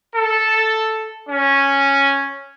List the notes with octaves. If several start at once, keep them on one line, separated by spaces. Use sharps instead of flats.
A4
C#4